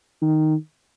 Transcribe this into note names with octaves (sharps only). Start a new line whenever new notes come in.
D#3